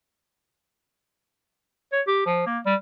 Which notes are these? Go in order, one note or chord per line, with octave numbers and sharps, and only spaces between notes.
C#5
G4
F3
A#3
G3